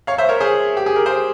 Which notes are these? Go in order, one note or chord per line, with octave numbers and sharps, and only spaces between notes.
C#5 F5
C5 E5
A#4 C#5
G#4 C5
G4
G#4
A#4
G#4 C5